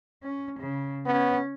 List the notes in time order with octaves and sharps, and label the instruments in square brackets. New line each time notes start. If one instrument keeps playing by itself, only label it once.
[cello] C#4
C#3
[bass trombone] B3 [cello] C#4 C#5